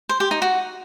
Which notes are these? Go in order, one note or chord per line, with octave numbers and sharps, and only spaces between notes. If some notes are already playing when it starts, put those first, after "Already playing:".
C5
G4
D#4
F#4